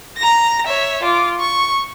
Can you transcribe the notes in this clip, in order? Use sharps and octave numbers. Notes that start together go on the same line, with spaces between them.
A#5 A#6
C#5 E5
F4 D6
C#6